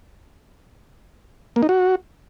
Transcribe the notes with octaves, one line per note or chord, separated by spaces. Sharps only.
A#3
D#4
F#4